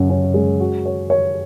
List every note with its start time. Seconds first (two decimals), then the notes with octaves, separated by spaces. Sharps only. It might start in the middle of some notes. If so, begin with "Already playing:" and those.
Already playing: F#2 C#3
0.10 C#4
0.34 G#3
0.60 F#4
0.85 C#5
1.10 C#5